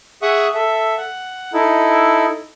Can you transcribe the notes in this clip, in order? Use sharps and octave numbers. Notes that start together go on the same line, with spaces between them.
G#4 E5 F#5 C#6 D#6
A4 E5
F#5
D#4 E4 A4